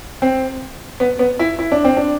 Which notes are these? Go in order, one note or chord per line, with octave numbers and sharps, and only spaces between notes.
C4
B3
B3
E4
E4
D4
C4
D4